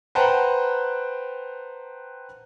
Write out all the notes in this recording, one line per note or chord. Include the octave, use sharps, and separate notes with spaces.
B4 C5 F#5 G5 A5 A#5